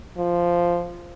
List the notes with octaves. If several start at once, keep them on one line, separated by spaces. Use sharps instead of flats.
F3